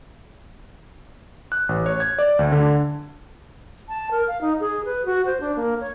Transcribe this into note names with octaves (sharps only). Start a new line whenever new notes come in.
F#6
A1
C#5
G#6
D5
D2
D3
A5
A#4
F5
D#4
G#4
B4
F#4
C5
D4
A#3
C#5